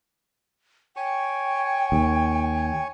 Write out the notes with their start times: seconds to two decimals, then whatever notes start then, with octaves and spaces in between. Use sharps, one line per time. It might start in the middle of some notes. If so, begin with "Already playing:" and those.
0.96 C#5 G5 G#5 C#6
1.92 D#2